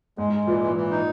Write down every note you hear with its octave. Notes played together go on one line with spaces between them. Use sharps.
G#2 G#3
G#3
A#2 E3
E3
E3
D#4